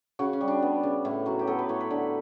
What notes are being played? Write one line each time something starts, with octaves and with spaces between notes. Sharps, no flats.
C#3 F#4
C#4
G3
D4
B3
C#3
A2 E4
F#3 F#4
G4
B3 A4
B4
A2 C#5
B4
D3